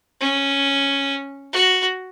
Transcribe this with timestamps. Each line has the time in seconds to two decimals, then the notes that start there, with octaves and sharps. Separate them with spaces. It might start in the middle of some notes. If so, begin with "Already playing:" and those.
0.21 C#4
1.53 F#4